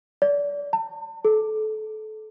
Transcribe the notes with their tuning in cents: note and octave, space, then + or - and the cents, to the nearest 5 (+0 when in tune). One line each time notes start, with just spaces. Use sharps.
D5 -30
A5 +40
A4 -25